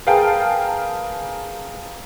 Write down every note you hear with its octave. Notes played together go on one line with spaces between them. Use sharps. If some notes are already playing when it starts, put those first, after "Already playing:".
G#4 A#4 B4 F5 G5 A5